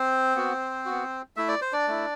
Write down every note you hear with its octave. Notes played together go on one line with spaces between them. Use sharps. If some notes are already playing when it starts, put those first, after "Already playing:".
Already playing: C4 C5
B3 F#4
B3 F#4
A3 E4 E5
D5
C5
D4 D5
A3 E4